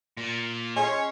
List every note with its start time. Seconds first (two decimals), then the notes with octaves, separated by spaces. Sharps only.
0.17 A#2
0.76 G#3 C#4 G#4 C#5 C6